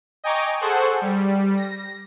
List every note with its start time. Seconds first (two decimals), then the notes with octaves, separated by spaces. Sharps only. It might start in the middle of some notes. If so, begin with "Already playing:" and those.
0.24 D#5 G5 G#5 A#5 C#6 D6
0.61 G#4 A4 C5 F#5 C#6
1.02 G3
1.57 A#6